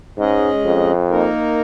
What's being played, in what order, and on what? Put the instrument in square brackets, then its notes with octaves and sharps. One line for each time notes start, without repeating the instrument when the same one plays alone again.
[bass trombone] G#2 [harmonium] G#3 C#4 G#4 D#5
[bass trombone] F2
[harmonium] A#3 D#4 A#4